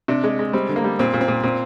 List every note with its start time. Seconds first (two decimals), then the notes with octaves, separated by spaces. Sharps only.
0.08 C3 D4
0.24 G#3
0.39 G#3
0.53 G3 C4
0.69 D3
0.76 A#3
0.84 G3
0.99 A#2 C4
1.14 A#2
1.21 C4
1.28 A#2
1.43 A#2 C4